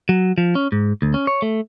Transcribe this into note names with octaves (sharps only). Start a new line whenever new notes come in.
F#3
F3
C#4
G#2
D2
C#4
C#5
A3